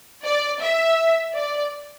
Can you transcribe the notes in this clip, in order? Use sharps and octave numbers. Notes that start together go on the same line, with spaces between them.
D5
E5
D5